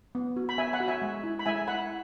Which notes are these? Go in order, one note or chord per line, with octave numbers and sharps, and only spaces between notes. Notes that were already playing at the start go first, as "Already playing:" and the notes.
B3
F#4
B5
B3 E5 G#5
F#5 B5
F#4
E5 G#5
G#3
E4
B5
G#3 E5 G#5
E4 F#5 B5